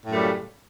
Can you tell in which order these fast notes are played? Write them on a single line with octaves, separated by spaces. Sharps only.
A2 F#2 A3 G3 C#3